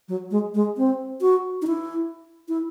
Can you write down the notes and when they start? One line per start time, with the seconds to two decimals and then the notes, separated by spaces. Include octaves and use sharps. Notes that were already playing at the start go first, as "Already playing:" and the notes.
0.08 F#3
0.31 G#3
0.54 G#3
0.77 C4
1.21 F#4
1.62 D#4
1.67 E4
2.48 E4